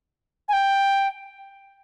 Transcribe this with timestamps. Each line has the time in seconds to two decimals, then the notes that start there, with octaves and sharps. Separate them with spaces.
0.49 G#5
0.53 G5